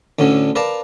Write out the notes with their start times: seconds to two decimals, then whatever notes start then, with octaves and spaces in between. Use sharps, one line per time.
0.19 D2 A2 D3 C#4
0.56 A#4 B4 D5 F5 A5 A#5